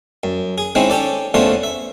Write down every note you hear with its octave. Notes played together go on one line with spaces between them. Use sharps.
F#2
G#4
G#3 C4 C#4 D#4 E4
C#4 G4 A4 D5
E2 D3 F3 A3 C#4 C6
E5